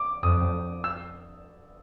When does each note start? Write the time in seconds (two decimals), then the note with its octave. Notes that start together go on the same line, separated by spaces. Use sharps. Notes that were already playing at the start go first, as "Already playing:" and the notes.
Already playing: D6
0.23 F2 D#6
0.84 E6